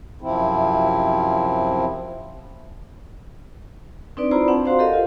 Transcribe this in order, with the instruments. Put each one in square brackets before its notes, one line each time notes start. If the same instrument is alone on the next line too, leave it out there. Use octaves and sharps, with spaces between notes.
[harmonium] F#2 C3 F3 C4 E4
[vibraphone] C4 D4 D#4 B4 D5
E4 F4 C5 D5 A#5 B5
C4 D4 F#5 A5
F#4 C5 F5 F#5 C6
G4 A4 A#4 D#5 F5
F4